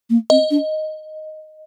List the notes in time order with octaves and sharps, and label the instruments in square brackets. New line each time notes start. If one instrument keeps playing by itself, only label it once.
[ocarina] A#3
[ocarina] C4 [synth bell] D#5
[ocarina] D4